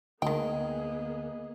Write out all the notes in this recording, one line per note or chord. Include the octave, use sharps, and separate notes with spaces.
D2 D#3 A#3 B3 D#4 G#4 G5